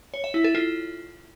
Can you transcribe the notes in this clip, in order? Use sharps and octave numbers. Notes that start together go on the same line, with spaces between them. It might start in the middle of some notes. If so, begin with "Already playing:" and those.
C#5
E5
E4
A4
F4